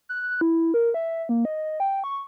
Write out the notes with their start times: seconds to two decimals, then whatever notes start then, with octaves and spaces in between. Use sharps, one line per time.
0.09 F#6
0.41 E4
0.74 A#4
0.94 E5
1.29 A#3
1.45 D#5
1.80 G5
2.04 C#6